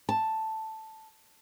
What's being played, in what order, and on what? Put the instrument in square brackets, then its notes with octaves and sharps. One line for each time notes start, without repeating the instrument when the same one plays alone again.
[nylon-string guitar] A5